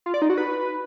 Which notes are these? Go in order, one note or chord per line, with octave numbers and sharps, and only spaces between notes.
F4
D5
D#4
F#4
B4